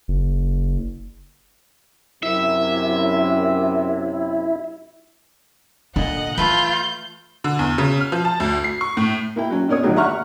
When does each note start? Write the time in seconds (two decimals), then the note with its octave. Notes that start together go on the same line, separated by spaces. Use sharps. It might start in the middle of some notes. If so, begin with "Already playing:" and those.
0.08 F#1
2.23 F#2 C3 E4 E5
5.96 A#2 D3 D4 D#5 F#5
6.38 E3 A3 F4 B4 G6
7.44 D3
7.59 E2
7.78 C#3
8.01 F6
8.12 F3
8.25 A5
8.40 D2
8.64 C7
8.81 C#6
8.97 A2
9.36 A#3 E4 G5
9.50 F#3 C#4
9.68 B2 D4 A#4 C#5 D#6
9.83 A2 D3 D#3 F#3 G3
9.96 E5 F#5 A#5 C#6 F6 F#6